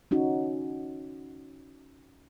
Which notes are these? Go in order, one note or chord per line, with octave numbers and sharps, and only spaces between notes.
C#4 D#4 F#4